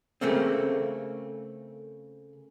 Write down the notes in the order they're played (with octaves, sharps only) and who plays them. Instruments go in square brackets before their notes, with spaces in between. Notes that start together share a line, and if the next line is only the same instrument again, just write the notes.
[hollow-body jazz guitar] C#3 A3 A#3 C4